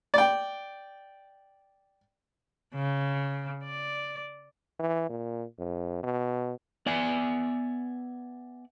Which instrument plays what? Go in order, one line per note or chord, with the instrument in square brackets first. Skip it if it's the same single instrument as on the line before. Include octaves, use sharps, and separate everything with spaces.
[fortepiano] D5 G5
[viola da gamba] C#3
D5
[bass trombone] E3
A#2
F2
B2
[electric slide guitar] B3 D5 E5 G#5